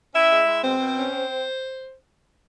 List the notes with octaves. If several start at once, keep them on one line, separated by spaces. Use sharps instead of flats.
C#4 E4 E5
G#3
G#3
B2 C4 C5
B2
C#4
C4